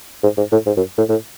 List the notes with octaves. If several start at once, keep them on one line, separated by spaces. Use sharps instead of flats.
G#2
G#2
A2
G#2
F#2
A2
A2